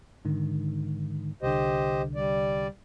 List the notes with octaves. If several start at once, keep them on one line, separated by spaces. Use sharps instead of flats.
G#2 D3 D#3
C2 D3 G4 C5 D#5
G3 D5